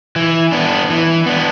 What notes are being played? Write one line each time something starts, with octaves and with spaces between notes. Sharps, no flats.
E3
B3 D4
E3
B3 D4